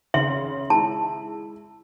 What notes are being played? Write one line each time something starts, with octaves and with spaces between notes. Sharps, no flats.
C#3 E5 C6 F#7
G#3 E4 A5